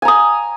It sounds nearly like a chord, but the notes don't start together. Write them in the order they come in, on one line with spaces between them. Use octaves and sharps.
G#5 A#5 D#6